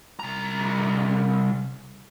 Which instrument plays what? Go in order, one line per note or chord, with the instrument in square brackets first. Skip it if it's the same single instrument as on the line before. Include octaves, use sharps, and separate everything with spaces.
[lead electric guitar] C2 A#5